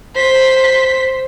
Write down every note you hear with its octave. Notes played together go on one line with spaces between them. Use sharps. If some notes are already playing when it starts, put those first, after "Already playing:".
C5 B6